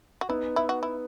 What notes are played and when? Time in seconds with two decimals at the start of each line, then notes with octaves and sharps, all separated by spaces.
0.21 F#4
0.29 B3 D#4 E4
0.56 E4
0.69 F#4
0.83 E4